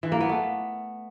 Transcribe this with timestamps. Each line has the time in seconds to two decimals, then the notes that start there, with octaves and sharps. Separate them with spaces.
0.03 E3
0.12 A#3
0.21 B3
0.29 A3